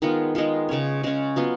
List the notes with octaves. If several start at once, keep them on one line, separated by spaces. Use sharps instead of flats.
D#3 G#3 B3 F4
D#3 G#3 B3 F4
C#3 G#3 C#4
C#3 G#3 C#4
F#3 B3 F4